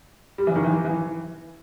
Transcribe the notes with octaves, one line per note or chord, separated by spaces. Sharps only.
G3
E3
D#3
E3
E3